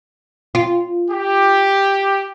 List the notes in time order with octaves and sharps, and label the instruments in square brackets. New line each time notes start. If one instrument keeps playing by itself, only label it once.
[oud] F4
[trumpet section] G4